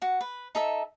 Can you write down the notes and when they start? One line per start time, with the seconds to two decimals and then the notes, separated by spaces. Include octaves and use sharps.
0.02 F#4 F#5
0.21 B4
0.55 D#4 A4 E5